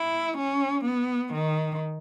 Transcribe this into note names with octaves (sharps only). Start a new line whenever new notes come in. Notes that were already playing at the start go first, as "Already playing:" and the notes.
Already playing: E4
C#4
B3
D#3